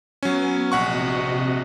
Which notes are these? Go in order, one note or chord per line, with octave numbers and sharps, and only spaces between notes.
F#3 B3 C#4 G#5
A#1 C3 F#4 D#5 F#5 C#6